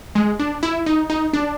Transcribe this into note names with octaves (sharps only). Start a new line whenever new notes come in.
G#3
D4
E4
D#4
D#4
D4